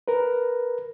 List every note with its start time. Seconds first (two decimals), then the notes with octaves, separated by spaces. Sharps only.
0.08 A#4 B4